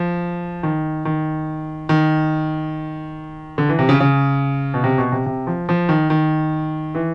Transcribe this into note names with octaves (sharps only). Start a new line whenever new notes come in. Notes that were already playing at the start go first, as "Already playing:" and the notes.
Already playing: F3
D#3
D#3
D#3
D3
E3
C3
C#3
C#3
B2
C3
B2
C3
C3
F3
F3
D#3
D#3
E3